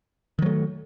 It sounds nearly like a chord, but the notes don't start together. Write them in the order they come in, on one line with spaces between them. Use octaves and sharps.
D#3 F#3 A3